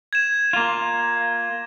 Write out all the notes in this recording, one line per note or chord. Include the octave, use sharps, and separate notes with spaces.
G#6 E7
A#3 F4